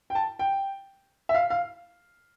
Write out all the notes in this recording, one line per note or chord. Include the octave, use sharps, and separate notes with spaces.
G5
A5
G5
E5
F5
F5